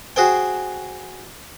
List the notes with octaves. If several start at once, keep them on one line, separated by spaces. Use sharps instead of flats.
F#4 G#4 C5 G5